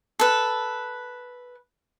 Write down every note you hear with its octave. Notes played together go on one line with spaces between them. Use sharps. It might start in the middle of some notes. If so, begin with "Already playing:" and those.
A4 B4